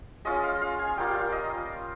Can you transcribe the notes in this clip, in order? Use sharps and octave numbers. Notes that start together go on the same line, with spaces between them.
G#3 C#4 F4 D#5
F5
F5
G#5
G3 A#3 F4 G5
F5
D#5